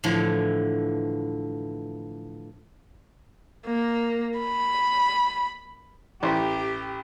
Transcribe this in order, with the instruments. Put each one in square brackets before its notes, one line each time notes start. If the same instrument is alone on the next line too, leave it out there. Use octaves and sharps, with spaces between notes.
[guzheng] A2 D3 E3 F3
[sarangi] A#3
B5
[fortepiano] A1 C5 [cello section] G4